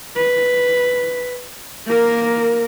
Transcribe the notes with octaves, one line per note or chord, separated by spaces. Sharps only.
B4
A#3 A#4